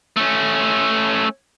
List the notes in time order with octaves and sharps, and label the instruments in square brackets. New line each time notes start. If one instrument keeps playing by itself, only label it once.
[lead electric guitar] A3 C#4